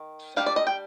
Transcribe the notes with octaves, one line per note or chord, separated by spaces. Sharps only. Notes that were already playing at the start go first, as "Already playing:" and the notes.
Already playing: D#3
G3 D4 F5
D5
D#5
G5